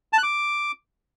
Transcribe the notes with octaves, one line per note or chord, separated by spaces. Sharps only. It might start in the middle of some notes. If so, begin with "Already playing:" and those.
A5
F#6
D6